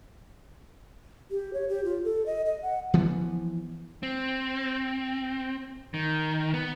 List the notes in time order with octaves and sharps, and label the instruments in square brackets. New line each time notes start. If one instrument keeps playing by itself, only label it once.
[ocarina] G4
C#5
G4
F4
A4
D#5
D#5
F#5
[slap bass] E3 F3 B3
[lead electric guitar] C4
D#3
B3